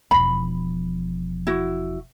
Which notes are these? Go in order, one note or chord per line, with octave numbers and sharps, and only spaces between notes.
E1 F3 B5
E4 F#4